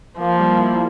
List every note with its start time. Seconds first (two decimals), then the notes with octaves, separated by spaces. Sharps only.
0.19 F3 A#3
0.39 G3
0.59 E4